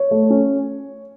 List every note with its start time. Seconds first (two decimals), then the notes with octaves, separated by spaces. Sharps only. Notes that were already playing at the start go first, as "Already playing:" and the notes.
Already playing: C#5
0.11 A3
0.30 C#4